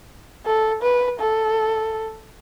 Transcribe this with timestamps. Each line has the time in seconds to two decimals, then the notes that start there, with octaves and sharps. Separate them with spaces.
0.46 A4
0.83 B4
1.20 A4